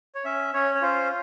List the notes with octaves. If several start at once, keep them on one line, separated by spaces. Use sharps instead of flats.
C#5
C#4 E5
C#4 C#5
C#5
F4 C5